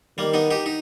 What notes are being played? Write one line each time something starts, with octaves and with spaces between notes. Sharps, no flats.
D#3 G3 A#3
B3 D#4
D#4 G4
D#4